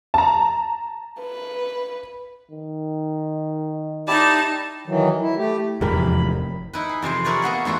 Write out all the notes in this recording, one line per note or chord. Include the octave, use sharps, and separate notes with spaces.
A5 A#5
B4
D#3
D#4 E4 G4 D5 A5
D#3 E3 F#3
E4
A3 G4
F1 E2 G#2 E3 G4 A#4 B5
D#4 E4 B4
G#4
F2 C3 E3 C5
E4 G#4 A#4 B4 C#5 D5
A#3 B3 F#4 G#4
E2 A3 F4 F#4 E5